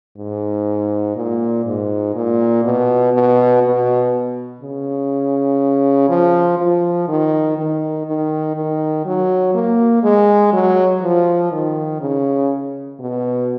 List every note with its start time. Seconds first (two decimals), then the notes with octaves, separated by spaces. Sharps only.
0.17 G#2
1.16 A#2
1.65 G#2
2.15 A#2
2.64 B2
3.13 B2
3.63 B2
4.61 C#3
6.09 F3
6.58 F3
7.08 D#3
7.57 D#3
8.06 D#3
8.56 D#3
9.05 F#3
9.54 A#3
10.03 G#3
10.53 F#3
11.02 F3
11.52 D#3
12.01 C#3
13.00 B2